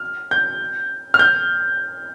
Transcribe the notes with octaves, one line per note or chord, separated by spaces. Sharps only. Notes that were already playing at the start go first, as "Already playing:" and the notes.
Already playing: F6
G6
F6
G6